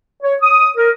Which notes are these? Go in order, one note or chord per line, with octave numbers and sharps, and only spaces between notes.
C#5
D#6
A#4